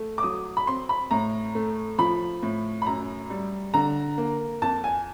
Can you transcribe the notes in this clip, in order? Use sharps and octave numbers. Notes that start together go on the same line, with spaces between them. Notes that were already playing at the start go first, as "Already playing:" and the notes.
Already playing: A3
D6
F#3 D#6
B5
C4 C6
B5
A2 A#5
A3
F3 B5
A2
B5
F#2 A#5
G3
D3 A#5
A#3
F2 A5
G#5